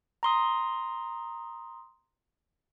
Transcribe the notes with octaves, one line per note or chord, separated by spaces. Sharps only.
A#5 C6 D#6